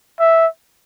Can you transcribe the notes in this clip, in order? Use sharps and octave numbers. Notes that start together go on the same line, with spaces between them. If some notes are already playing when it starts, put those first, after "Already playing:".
E5